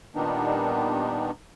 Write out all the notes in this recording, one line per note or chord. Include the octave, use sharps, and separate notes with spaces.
A#2 D#3 G3 B3 D4 D#4